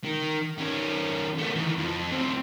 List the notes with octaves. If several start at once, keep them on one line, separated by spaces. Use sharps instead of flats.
D#3
D#3 C#4
A3 B3
D#3 E3
F2
D2 C4